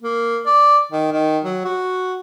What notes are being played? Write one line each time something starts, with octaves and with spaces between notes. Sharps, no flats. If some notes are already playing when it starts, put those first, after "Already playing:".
A#3
D5
D#3
D#3
F#3
F#4